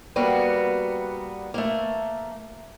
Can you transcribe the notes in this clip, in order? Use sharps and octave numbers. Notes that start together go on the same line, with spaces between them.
G3 A#3 B3 F#4
A3 A#3